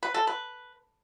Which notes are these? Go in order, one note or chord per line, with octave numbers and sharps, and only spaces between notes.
B4
A4
B4